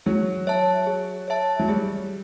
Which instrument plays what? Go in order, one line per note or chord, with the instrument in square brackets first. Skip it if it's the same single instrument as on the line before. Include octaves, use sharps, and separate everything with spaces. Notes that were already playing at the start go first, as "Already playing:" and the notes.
[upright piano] F#3 [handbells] G#4
[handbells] C#5 E5 A5
G#4
C#5 E5 A5
[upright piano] F#3
[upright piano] G3 [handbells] G#4